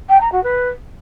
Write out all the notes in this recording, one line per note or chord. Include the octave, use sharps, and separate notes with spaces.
G5
A#5
F#4
B4